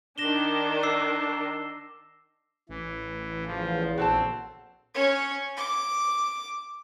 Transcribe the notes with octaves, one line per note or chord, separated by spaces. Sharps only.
D#3 D4 A#6 E7 G7
D6 E6 C7
A1 E3
E2 C#3 F3
A#1 C4 F#4 A4 A5
C#4 C#5
D6